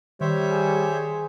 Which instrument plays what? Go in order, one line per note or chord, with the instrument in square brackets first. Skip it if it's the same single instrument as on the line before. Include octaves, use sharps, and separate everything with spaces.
[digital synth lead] D#3 [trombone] G3 [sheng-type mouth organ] C5 C#5 E5
[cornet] G#4